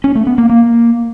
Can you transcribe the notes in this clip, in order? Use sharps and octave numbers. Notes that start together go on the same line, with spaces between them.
C#4
A3
B3
A#3
A#3